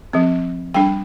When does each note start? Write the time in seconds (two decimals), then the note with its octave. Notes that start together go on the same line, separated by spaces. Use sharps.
0.13 F3 C4
0.74 G3 D4 G5